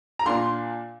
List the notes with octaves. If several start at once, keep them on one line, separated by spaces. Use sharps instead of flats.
A#5
A#2 A#3 D4 C6